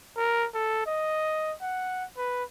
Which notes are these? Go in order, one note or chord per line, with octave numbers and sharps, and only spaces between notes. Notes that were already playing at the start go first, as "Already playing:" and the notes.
A#4
A4
D#5
F#5
B4